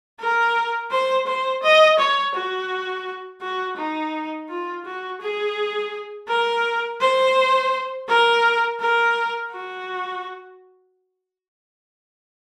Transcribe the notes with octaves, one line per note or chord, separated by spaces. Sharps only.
A#4
C5
C5
D#5
C#5
F#4
F#4
D#4
F4
F#4
G#4
A#4
C5
A#4
A#4
F#4